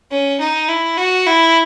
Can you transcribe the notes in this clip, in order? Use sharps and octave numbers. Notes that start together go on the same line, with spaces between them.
C#4
D#4
E4
F#4
E4